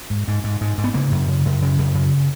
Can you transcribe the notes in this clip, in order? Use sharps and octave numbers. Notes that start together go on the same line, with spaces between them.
G#2
G#2
G#2
G#2
G#2
B3
C#3 A#3
F#2
C#3
F#2
C#3
F#2
C#3